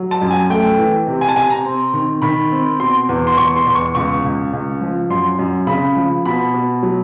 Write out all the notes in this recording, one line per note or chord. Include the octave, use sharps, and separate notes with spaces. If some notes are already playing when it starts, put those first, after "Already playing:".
Already playing: F#3
A5
F#2
G#5
A3 G5
E3
C3
G#5
A5
C3 G#5
A#5
C4
D#3
D#3 B5
C4
B2 C6
E2
C6
E2 C#6
C6
E2
C#6
C#2 C#6
C#2
C#2
F3
F#2 C6
F#2
C#3 B5
F3
B2 B5
B2
F#3